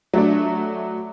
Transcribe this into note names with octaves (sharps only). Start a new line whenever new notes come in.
F#3 A3 D4